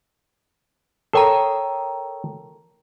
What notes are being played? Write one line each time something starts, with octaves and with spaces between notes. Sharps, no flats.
A4 A#4 C#5 G5 A#5